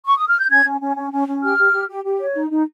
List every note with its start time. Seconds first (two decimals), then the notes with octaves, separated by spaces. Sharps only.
0.06 C#6
0.17 D#6
0.28 F6
0.39 G6
0.50 C#4 G#6
0.66 C#4
0.81 C#4
0.96 C#4
1.12 C#4
1.27 C#4
1.42 G4 F6
1.58 G4
1.73 G4
1.89 G4
2.04 G4
2.19 C#5
2.35 D#4
2.50 D#4